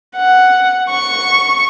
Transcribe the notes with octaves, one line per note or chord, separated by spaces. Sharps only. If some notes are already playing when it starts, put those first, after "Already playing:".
F#5
C#6